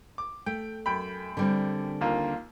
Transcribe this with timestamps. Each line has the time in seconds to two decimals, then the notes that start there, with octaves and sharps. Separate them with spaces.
0.18 D6
0.46 A3 G5
0.86 F#2 G5 B5
1.37 D3 G3 C4
2.01 D#2 A#3 F4